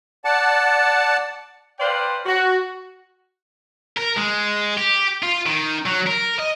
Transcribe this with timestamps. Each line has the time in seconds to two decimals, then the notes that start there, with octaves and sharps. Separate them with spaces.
0.25 D5 F#5 A5
1.79 B4 C5 D5 F5 G5 C6
2.26 F#4
3.97 A#4
4.17 G#3
4.78 G4
5.23 F4
5.46 D#3
5.86 F#3
6.07 A#4
6.39 D#5